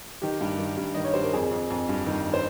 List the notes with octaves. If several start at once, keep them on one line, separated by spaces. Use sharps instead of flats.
D#3 G4
G2
D#3
G2
D#3 D#5
C#5
G2 C5
A#4
F2 G#4
F2
F2
G2
D#3
C5